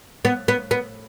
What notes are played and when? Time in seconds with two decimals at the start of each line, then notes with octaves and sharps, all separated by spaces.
0.25 B3
0.48 B3
0.71 B3